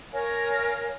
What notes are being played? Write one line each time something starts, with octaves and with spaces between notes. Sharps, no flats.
A#4 C#5 F5 G#5